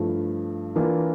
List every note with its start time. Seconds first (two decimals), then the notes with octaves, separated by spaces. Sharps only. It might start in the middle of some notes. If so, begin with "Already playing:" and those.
Already playing: G2 F3 A3 E4
0.75 E3 A#3 D4 F4